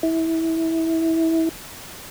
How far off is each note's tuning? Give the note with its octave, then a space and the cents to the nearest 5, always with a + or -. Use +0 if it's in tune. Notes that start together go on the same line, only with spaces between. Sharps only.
E4 -20